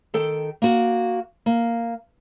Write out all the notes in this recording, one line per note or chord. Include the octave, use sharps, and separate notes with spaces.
D#3 A4 G5
A#3 F#4
A#3